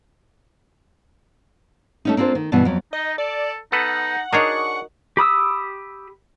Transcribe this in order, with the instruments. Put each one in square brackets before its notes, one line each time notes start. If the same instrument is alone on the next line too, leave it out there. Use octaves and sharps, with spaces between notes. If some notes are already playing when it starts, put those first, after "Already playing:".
[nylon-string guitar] A3 C#4 D#4
A#3 C4 D4 F4 C5
D#3
G2 B2 E3 B3
F2 F#3
[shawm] D#4 [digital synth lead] D#5
[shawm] A4 [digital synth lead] D5
[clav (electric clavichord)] B3 A4 B4 [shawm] D#4 [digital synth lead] F#5
[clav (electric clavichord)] D4 G#4 C#5 [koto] D#4 F#4 A#4 [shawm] C#6
[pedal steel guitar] G4 B5 D#6 E6